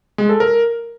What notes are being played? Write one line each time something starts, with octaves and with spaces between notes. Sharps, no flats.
G#3
A4
A#4